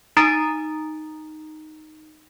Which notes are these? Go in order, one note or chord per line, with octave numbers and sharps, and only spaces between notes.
D#4 A#5 D#6 A6 D7